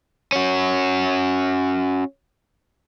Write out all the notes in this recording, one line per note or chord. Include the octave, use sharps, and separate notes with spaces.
C#4 F#4